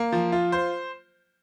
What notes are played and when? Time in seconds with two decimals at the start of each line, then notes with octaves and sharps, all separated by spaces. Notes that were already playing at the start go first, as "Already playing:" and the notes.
Already playing: A#3
0.12 F3
0.32 F4
0.52 C5